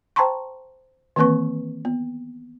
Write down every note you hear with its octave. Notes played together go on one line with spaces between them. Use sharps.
C5 G5 A5 A#5 C6 C#6
D#3 E3 A#3 C4 B4 C#6
B3